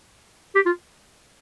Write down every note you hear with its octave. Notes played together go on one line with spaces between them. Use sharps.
G4
F4